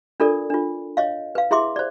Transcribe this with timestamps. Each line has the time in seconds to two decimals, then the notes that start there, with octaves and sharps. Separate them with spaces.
0.20 D4 F4 A4 A#4 D5
0.50 D4 F4
0.97 C#5 D#5 F5
1.35 B4 F5
1.51 E4 G#4 E5 C6 D6
1.76 C5 D5